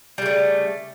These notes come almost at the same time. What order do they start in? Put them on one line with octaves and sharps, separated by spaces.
G3 C#3 A3